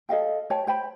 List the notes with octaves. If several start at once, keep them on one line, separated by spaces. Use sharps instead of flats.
A4 D#5 F5 G5
C#5 G5 A5
C5 G5 B5